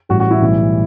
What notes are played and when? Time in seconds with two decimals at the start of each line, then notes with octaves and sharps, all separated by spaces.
0.09 A1 A2 G3 F#4
0.20 F#4
0.31 E4
0.42 B1 A2 E3 G3